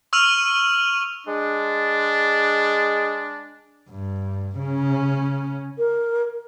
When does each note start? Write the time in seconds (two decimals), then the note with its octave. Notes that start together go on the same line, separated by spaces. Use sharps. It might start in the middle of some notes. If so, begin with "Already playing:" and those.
0.13 C#6 E6 F6 D#7 F7 F#7
1.27 G#3 D4
3.90 G2
4.58 C#3 C#4
5.78 A#4